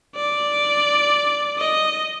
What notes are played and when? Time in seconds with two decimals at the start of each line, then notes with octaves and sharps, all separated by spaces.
0.16 D5
1.58 D#5